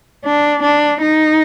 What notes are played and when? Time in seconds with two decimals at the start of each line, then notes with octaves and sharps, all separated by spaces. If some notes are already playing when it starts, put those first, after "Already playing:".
0.25 D4
0.62 D4
1.01 D#4